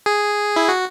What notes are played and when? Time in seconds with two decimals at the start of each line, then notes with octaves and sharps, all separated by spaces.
0.06 G#4
0.56 E4
0.69 F#4